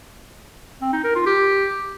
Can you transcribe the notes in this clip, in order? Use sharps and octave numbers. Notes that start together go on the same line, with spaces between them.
C4
D#4
A#4
F4
G4